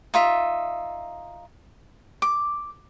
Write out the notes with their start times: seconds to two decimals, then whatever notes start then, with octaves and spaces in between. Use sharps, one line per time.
0.14 D#4 F4 E5
2.22 D6